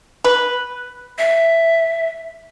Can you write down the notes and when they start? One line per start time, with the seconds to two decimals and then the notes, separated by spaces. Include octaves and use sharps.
0.24 B4
1.18 E5